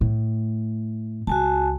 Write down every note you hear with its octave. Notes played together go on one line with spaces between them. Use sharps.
A2
C#2 F#4 G#5 A5